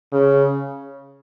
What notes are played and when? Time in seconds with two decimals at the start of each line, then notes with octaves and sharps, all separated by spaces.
0.12 C#3